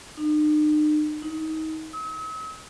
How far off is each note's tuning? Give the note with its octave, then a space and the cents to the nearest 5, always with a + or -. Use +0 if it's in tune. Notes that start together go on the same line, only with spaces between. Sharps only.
D#4 -45
D#4 +25
E6 -45